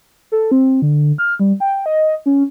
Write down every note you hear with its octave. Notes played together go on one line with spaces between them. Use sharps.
A4
C4
D3
F6
G3
G5
D#5
C#4